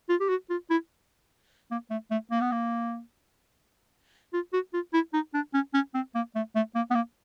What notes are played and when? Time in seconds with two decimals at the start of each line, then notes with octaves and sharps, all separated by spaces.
0.09 F4
0.20 G4
0.29 F#4
0.50 F4
0.70 E4
1.71 A#3
1.90 A3
2.11 A3
2.31 A#3
2.41 B3
2.52 A#3
4.33 F4
4.53 F#4
4.73 F4
4.93 E4
5.13 D#4
5.34 D4
5.54 C#4
5.74 C#4
5.94 C4
6.15 A#3
6.35 A3
6.55 A3
6.75 A#3
6.90 B3
6.95 A#3